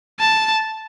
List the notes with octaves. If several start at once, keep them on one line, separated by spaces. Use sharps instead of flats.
A5